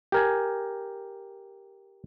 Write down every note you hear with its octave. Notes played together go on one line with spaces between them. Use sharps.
G4 A#4 G#5